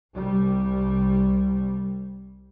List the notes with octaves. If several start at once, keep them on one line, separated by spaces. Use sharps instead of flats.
C2 G3